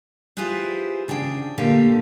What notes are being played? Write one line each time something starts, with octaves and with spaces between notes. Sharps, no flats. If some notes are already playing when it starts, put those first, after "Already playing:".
E4 F4 G4 G#4 B4 C5
C#3 D4 G#4 G5
A#2 D3 A3 G4 F5 G5